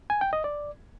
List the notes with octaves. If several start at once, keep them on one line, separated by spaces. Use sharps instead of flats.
G#5
G5
D#5
D5